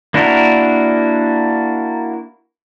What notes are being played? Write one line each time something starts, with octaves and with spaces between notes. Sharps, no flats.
A#3 D4 E4 F#4 A#4